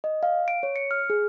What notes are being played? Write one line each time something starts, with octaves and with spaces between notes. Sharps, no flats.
D#5
F5
D7
C#5
C#7
F6
G#4